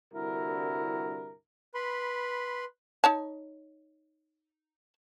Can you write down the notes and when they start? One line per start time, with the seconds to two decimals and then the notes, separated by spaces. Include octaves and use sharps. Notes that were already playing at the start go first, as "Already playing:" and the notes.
0.14 C2 G2 D3 E4 F#4 A#4
1.74 B4 B5 C6
3.04 D#4 C#5 A5